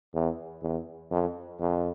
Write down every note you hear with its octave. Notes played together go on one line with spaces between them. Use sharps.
E2
E2
F2
F2